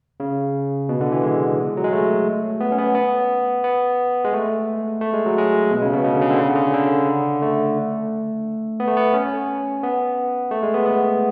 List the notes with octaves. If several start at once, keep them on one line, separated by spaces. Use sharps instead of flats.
C#3
B2
D3
E3
G#3
F#3
G#3
A3
B3
C#4
B3
B3
B3
G#3
A3
A3
G#3
F#3
G#3
B2
C#3
B2
C#3
D3
C#3
D3
C#3
D3
C#3
D3
A3
B3
A3
B3
C#4
B3
A3
G#3
B3
B3